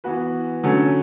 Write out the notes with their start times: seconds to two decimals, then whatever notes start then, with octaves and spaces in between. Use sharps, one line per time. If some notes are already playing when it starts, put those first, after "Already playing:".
0.04 E3 B3 F#4 B4
0.64 D3 F#3 A3 C#4